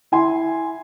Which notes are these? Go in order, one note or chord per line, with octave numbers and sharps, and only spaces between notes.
E4 G#5 C6